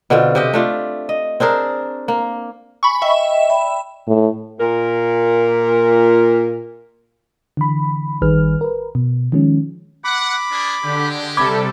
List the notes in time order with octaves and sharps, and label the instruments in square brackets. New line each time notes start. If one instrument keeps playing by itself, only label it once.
[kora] B2 D3 C4 F4
C3 G4 D#5
A3 D4 F4
D#5
C4 D4 G#4 A#4
A#3
[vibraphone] G#5 [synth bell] B5 C#6
[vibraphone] D#5 G5 [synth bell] E5
[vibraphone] D5 G5 B5
[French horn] A2
[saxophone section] A#2 A#4
[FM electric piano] D3 E3 B5
A1 D#3 G3 G#4 B4 F6
A#4 B4
B2
D#3 F3 G#3 C#4
[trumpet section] F#5 [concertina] B5 D6
[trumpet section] A#3 D4 G#4
[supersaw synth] D3 [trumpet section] G#3 G4
[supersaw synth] C3 G3 A4 [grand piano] B5 D6 G#6